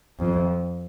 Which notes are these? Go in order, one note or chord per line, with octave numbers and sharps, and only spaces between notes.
F2